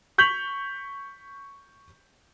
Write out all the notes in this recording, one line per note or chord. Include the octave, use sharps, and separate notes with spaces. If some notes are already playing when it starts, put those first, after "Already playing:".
C#6 G6 B6 F7 F#7